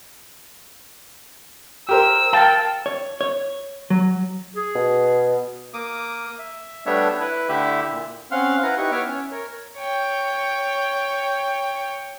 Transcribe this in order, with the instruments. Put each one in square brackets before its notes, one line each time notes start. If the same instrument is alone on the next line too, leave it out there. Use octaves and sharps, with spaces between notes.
[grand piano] G4 A#4 C5 [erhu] E6
[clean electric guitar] A#4 A5 [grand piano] F5 G5
[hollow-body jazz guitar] C#5
C#5
F#3
[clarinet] G#4
[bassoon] B2
[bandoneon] A#3 D6 D#6
E5
G3 A3 B3 D4 C#5 E5
E4 B4
D3 A3 E4 G4 E5
A#2
[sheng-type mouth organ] C4 C#4 F5 F#5 C6 F6
E4 B4 F#5 A#5
D#4 E4 G4 B4 C#6
B3 C#5 E5 D6 F6
C#4
A#4 C#5
[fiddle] C#5 G5